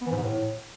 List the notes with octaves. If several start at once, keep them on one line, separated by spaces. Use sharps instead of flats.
B3
E3
G#2
C3
A2